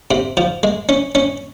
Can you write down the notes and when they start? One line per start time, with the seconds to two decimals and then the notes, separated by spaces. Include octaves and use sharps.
0.11 C3
0.37 F3
0.63 G#3
0.89 C#4
1.15 C#4